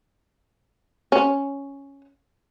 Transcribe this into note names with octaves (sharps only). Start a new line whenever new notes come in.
C#4